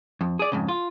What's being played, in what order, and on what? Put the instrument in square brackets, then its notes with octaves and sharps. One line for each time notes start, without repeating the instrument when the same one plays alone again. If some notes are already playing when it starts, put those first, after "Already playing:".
[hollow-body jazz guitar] F2
G#4 D5
F2 G#2 C#3
F4